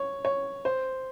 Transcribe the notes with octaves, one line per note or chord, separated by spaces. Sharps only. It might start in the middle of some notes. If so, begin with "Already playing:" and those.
Already playing: C#5
C#5
C5